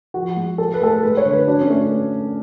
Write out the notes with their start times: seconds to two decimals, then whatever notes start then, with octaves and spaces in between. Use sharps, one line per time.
0.14 F3 F#4
0.37 G#3
0.58 F#3 A4
0.74 B4
0.82 A3 A4
0.88 B4
1.03 G#3 B4
1.17 C#5
1.25 D3
1.33 B4
1.47 F#3 D4
1.61 C#4
1.70 A3